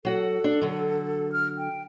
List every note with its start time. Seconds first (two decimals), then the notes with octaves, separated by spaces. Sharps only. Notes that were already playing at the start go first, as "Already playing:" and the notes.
0.05 F#3 F#4 A4 F#5
0.44 D4
0.62 D3 F#3
1.32 F6
1.58 G5